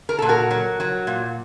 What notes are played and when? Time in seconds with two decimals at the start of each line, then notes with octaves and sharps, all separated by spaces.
0.09 A#4
0.18 A#2 A4
0.29 F#4 A#4
0.51 F#3
0.80 F#3
1.07 A#2